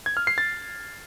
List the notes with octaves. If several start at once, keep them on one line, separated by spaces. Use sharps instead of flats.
G#6
F6
C7
A6